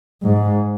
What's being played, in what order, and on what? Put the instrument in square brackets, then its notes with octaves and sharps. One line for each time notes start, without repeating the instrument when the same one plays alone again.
[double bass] G#2